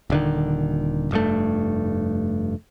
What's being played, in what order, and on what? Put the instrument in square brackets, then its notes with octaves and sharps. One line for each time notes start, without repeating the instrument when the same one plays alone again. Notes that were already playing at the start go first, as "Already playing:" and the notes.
[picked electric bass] D#1 D3 D#3
F1 G2 A3